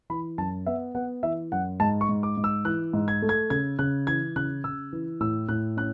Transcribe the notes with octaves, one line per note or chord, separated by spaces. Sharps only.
E3 B5
F#2 A5
B3 E5
B3 F#5
E3 E5
F#2 F#5
G#2 A5
C#6
G#2
D6
G#2
E6
E3 F#6
G#2
G#6
A3
G#6
C#3 G#6
C#3 F#6
E3 G#6
C#3 F#6
C#3 E6
E3
A2 E6
A2 F#6
C#4 F#6